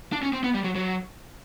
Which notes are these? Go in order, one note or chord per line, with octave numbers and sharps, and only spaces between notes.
D4
C#4
C4
B3
G3
F#3
F#3